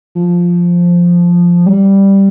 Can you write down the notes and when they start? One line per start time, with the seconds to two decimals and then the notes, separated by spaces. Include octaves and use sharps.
0.15 F3
1.66 G3